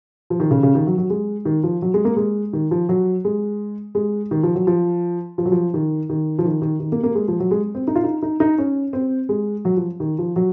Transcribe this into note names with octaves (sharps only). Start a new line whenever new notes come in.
F3
D#3
C#3
C#3
D#3
F#3
F#3
G#3
D#3
F3
F#3
G#3
A#3
G#3
D#3
F3
F#3
G#3
G#3
D#3
F3
F#3
F3
F3
F#3
F3
D#3
D#3
F3
D#3
D#3
D#3
A#3
A#3
G#3
F3
F#3
G#3
C4
D#4
F4
D#4
D#4
D#4
C#4
C4
G#3
F#3
F3
D#3
F3
F#3